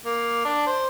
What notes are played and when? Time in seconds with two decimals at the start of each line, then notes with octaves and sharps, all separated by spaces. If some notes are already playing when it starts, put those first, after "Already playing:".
0.06 A#3
0.45 D4
0.67 C5